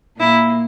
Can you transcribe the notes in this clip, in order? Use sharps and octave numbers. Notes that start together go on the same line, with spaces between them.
A#2 A#3 E4